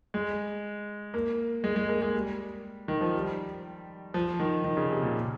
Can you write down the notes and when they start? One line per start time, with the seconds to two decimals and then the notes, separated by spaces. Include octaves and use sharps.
0.14 G#3
1.14 A#3
1.64 G#3
1.76 G#3
1.89 A#3
2.02 G#3
2.14 G3
2.88 D#3
3.01 F3
3.14 G3
4.14 F3
4.40 D#3
4.65 D#3
4.77 C#3
4.90 C3
5.02 A#2